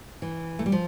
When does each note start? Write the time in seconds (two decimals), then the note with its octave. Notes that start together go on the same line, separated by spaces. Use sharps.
0.22 E3
0.59 A3
0.66 G3
0.72 F3